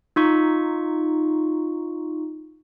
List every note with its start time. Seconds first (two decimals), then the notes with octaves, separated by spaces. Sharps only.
0.16 D#4 F4 C#6